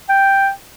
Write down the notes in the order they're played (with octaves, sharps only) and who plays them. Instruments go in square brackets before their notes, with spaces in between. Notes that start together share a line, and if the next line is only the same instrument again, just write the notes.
[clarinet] G5